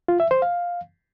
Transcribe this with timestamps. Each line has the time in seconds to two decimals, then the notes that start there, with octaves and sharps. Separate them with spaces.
0.08 F4
0.20 E5
0.31 C5
0.42 F5